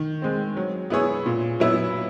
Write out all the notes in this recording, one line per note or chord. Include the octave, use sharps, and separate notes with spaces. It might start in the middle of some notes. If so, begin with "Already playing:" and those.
Already playing: D#3
G#3 C4
F#3
B3 E4 G#4 C#5
A#2
F#3 B3 E4